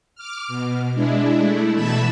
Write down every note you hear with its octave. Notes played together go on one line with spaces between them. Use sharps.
D6 F6
B2
G#3 D4 E4
A3 E4
B2 E3 E5 A5 B5 E6